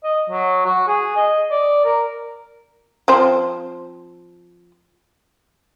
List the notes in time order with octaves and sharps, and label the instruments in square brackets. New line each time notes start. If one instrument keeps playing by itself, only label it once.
[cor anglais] D#5
F#3
F#4
G#4
D#5
D5
A#4
[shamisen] F3 C4 C5